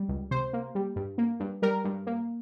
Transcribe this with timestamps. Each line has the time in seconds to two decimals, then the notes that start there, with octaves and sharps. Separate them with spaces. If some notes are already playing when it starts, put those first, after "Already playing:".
Already playing: G3
0.08 C#2
0.31 C3 C5
0.53 A#3
0.75 G3
0.96 G2
1.18 A#3
1.40 G2
1.62 G3 A#4
1.84 G2
2.07 A#3